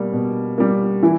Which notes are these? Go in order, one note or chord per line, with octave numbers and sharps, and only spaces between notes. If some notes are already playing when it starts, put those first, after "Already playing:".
Already playing: B2 G3 A#3
B2
G3 A#3
E3 E4